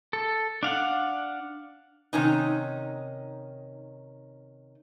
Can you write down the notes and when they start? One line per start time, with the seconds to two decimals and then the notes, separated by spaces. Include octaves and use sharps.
0.13 A4
0.63 D4 F5 F#5
2.13 C3 D#3 C#4 D#4